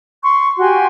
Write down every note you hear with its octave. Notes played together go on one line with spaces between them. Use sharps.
C6 C#6
F#4 G4 G#5 C6